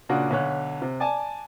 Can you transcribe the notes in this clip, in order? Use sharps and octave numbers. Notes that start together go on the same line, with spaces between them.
A#2 C#3 D4 F#4
B1 D3 C#5 F#6
C3
D5 G#5 A5